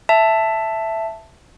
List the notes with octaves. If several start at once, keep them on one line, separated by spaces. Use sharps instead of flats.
E5 A5